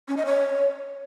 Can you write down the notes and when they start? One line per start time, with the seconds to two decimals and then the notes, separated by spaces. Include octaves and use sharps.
0.08 C#4
0.17 D#5
0.25 C#5